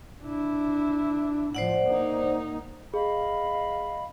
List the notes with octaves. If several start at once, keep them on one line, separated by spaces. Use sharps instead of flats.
D4 E4
A2 F3 C5 D5 F#5
A#3 D#4
G#4 D#5 F5 B5